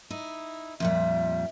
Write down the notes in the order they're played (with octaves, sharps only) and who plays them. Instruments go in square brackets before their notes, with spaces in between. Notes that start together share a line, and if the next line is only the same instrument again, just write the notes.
[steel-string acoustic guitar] D#4 E4
[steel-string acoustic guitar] F2 A#2 G3 [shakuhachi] E5